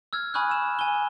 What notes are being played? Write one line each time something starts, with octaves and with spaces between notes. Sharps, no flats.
E6 F6 G#6
G#5 B5 C#6 D#6 F6 F#6
E6 E7
G#5 G7